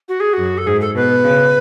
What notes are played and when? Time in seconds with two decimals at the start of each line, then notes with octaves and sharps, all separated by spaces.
0.09 F#4
0.20 G#4
0.33 F#2 F#4
0.58 A4
0.66 G#2 G#4
0.81 A4
0.95 B2 B4
1.24 C#3